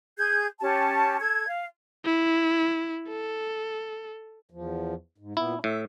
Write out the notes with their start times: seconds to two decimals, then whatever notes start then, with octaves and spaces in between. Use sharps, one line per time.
0.17 G#4 G6 G#6
0.60 C#4 G4 A5
1.20 A4 G#6
1.47 F5
2.05 E4
3.09 A4
4.50 E2 F3
5.18 G#2
5.37 A#2 B3 E4
5.64 A2 E5